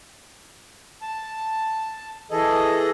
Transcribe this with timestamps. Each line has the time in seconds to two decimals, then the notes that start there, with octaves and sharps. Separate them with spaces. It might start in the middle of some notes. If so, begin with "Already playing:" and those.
1.02 A5
2.31 E3 G#4 A4 D#5